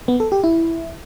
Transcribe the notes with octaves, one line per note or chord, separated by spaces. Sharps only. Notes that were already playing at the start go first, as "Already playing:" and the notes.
B3
A4
G4
E4